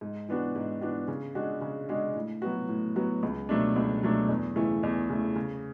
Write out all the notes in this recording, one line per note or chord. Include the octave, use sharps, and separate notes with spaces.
G#2
E3 B3 D4 F#4
G#2
E3 B3 D4 F#4
C#3
G#3 D4 F#4
C#3
G#3 D4 F#4
A2
F#3 B3 F#4
A2
F#3 B3 F#4
C#2
B2 F#3 A3 D4
C#2
B2 F#3 A3 D4
E2
C#3 E3 A3
E2
C#3 E3 A3
C#3